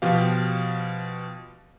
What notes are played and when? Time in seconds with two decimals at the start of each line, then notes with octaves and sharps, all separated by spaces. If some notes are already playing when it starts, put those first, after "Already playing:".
0.02 B2 F3 G4 F5